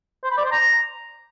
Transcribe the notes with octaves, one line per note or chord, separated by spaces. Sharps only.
C5
B5
D5
C5
A#5